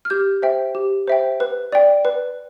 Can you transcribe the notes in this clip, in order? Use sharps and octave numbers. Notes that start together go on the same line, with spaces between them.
F6
G4 G6
C5 E5 G5
G4
C5 E5 G5
B4
D5 G5
B4